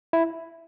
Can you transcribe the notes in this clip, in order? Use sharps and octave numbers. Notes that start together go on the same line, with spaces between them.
E4